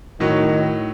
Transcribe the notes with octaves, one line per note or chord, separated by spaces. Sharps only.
A2 D#3 F#3